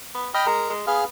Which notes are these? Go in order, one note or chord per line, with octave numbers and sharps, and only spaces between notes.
B3
D#5 G5 B5 F6
G#3 A#4 A#5
G#3
B3 G#4 F5 F6